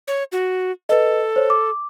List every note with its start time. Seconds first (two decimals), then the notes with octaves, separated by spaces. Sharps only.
0.08 C#5
0.32 F#4
0.89 A4 B4 D#5
1.36 C5 C#5
1.50 D6